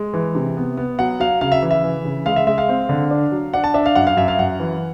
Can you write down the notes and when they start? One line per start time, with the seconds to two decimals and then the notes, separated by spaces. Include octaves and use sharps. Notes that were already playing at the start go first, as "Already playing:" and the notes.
Already playing: G#3
0.14 E3
0.35 C3
0.57 B3
0.77 B3
0.99 F#3 F#5
1.20 F#3 F5
1.41 C#3 F5
1.52 E5
1.62 E3
1.71 E5
1.84 E3
2.05 C#3
2.26 G#3 F5
2.36 E5
2.47 G#3 E5
2.58 F5
2.69 C4
2.89 D3
3.11 D4
3.32 F#3
3.54 D4 F#5
3.64 A5
3.74 D4 E5
3.86 F5
3.95 F#2 F#5
4.07 F5
4.17 F#2 E5
4.28 F5
4.39 F#2 F#5
4.59 E3